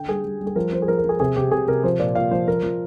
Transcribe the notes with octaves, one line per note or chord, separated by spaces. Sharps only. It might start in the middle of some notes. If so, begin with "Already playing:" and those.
Already playing: D3 G5
G3 G#4
G3
G3
G#4
F3 A#4
F3 C5
G#4
F3 A#4
A#4
F3 G#4
C3 G#4
C3 G4
C3 G#4
C3 A#4
F3 C5
A#2 D5
A#2 F5
F3 C5
F3 A#4
F3